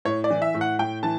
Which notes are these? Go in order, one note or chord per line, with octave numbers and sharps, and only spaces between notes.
A2 C#5
D5
E3
E5
A2
F#5
A2 G5
E3 A5